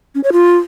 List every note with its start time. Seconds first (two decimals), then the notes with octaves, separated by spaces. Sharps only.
0.15 C#4
0.24 C#5
0.32 F4